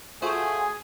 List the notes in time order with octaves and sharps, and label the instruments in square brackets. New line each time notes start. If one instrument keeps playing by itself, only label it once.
[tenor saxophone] A3 [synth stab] F4 F#4 C5 [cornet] G#4 [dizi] G#5